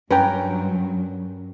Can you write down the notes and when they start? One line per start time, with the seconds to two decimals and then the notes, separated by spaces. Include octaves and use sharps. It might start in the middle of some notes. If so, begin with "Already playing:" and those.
0.11 G2 F#3 C#4 A#4 B4 G5